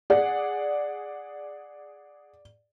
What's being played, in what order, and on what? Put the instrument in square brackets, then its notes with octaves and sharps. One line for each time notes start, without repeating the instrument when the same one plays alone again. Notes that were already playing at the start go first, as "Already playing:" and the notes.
[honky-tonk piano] G#4 F#5 [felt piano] D5